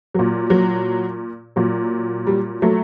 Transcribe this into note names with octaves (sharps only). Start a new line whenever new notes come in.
A#2 F#3
F#3
A#2 F#3
G3
F#3 A3